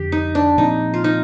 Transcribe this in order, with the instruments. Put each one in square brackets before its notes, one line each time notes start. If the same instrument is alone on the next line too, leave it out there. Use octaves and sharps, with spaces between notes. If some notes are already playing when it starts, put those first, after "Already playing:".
Already playing: [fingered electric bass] F2 D3 [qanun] G4
[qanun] D#4
D4
[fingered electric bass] A#2 F3 C4 [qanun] D#4
[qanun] F4
D#4